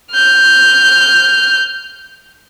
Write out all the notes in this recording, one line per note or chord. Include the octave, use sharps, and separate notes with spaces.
F6 G6